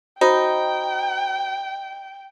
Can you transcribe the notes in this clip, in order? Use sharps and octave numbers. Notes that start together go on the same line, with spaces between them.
D#4 F#4 C5 G5 B5